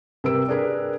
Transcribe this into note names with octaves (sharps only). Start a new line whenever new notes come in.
C3 G3 A#4 B4 E6 D7
D4 G#4 A#4 B4